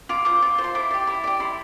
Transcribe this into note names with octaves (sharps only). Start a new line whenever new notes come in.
F4 D6
C5 D6
F4
C5
C6
E4 D6
G4 D5
E4
G4 D5
E4 C6